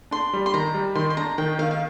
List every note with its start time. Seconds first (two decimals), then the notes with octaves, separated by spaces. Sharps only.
0.11 D4 C6
0.33 G3
0.46 C6
0.54 D#3 A#5
0.74 G3
0.95 D#3 C6
1.10 C6
1.17 D4 A#5
1.38 D#3 G5
1.59 D#3 F5
1.71 F5